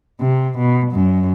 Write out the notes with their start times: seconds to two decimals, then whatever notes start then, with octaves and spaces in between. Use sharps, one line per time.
0.21 C3
0.58 B2
0.91 F#2